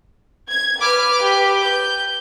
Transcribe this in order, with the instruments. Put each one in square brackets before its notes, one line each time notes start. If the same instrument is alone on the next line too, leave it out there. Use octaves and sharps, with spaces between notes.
[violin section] G#6
[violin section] B4 [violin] D6 F6
[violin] G4
G6